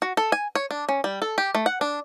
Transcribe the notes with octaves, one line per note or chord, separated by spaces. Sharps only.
F#4
A4
G#5
C#5
D4
C#4
G3
A4
G4
A3
F#5
D4